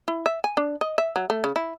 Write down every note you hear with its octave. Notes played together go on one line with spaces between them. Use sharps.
E4
E5
G#5
D4
D#5
E5
F#3
A3
C#3
E4